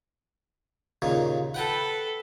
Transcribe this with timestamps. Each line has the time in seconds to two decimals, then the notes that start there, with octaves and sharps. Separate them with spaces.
1.02 D#2 A#2 C#3
1.54 A4 B4 F#5 G5 A5